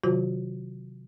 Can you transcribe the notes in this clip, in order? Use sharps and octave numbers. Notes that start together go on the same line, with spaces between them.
C3 D#3 F#3 F4 F#4 C5